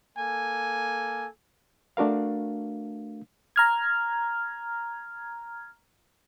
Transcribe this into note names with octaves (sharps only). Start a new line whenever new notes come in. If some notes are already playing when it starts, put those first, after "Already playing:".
A#3 A4 G#5
A3 D4 F#4 A#4 F5
A#5 F6 G#6